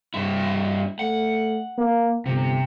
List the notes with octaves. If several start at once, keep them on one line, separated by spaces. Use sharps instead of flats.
G2 E4
A3 F#5
A#3
G1 C3